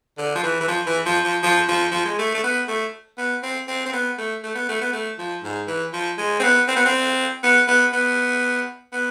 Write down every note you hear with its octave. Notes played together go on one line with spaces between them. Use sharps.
D3
F3
E3
E3
F3
E3
F3
F3
F3
F3
F3
G#3
A3
A3
B3
A3
B3
C4
C4
C4
B3
A3
A3
B3
A3
B3
A3
F3
G#2
E3
F3
G#3
C4
B3
C4
B3
C4
B3
B3
B3
B3